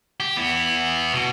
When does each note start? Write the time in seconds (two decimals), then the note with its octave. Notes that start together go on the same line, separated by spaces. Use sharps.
0.20 G4
0.37 B3 E4
1.13 B2